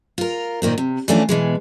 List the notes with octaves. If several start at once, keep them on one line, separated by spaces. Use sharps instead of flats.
F4 A#4
A#2 D#3 A#3 C4
C3
E3 F3 A3 C#4 D4 F4
B2 E3 G#3